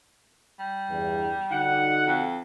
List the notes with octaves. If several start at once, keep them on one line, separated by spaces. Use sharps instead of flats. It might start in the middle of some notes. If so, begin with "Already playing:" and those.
G3
E2 G2
D3 D#4 F#4 F#5
F2